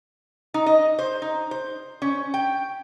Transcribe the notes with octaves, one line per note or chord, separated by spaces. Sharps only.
D#4
D#5
C5
D#4
C5
C#4
G5